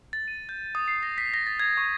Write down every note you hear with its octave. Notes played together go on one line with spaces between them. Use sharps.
A6
D#7
G6
D#6
C7
A#6
B6
A#6
A6
G#6
C#6